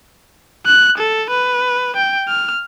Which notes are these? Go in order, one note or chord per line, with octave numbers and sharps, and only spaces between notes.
F#6
A4
B4
G5
F6